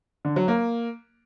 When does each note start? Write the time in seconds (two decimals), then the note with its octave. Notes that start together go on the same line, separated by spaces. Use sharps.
0.25 D3
0.36 F#3
0.48 A#3